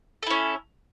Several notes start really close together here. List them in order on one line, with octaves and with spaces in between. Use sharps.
A4 E4 C#4